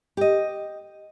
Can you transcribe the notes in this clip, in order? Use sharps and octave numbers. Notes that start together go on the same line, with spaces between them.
G4 D#5